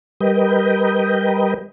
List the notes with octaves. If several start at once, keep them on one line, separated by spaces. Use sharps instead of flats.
G3 A#4 B4 D#5 G5